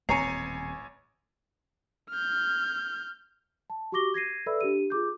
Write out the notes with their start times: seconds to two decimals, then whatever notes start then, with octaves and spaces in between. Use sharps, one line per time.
0.09 D#1 A1 C4 C#5 G#5 A#5 C7 C#7
2.10 F6 G6
3.70 A5
3.92 F#4 G4 C#6 D6 A#6 G7
4.14 G#6 A#6 C7 D#7
4.46 A4 B4 D5 E5 B5 E6
4.61 D4 G4 D#7
4.90 F4 G#4 D6 G6